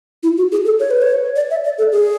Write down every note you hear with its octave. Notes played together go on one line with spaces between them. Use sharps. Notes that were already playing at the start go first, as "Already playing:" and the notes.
E4
F#4
G#4
A4
C#5
B4
C#5
D5
E5
D5
A4
G#4